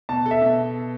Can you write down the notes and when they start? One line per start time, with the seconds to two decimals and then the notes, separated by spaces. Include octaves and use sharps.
0.09 B2 A5
0.26 A4
0.31 E5
0.42 B2